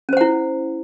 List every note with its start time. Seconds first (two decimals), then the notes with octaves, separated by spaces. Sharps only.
0.09 C#4
0.13 C5
0.17 F#5
0.21 E4